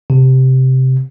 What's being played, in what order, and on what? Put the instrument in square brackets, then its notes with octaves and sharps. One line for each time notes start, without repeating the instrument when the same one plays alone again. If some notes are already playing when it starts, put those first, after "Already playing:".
[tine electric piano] C3